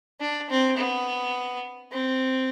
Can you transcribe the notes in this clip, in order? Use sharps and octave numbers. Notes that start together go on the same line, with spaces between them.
D4
C4
B3
C4